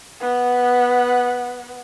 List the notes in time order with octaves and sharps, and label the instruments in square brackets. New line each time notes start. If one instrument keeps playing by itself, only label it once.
[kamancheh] B3 F#5